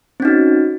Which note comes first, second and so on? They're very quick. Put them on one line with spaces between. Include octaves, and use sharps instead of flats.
C4 C#4 D#4 F#4